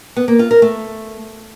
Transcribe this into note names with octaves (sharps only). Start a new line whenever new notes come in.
B3
A#3
F4
A#4
A3